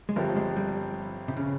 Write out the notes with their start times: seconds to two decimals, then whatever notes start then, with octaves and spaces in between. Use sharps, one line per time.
0.09 G#3
0.16 G1 G2 F3 A#3 C4 G4
0.37 G#3
0.57 G3
1.28 C3
1.37 C#3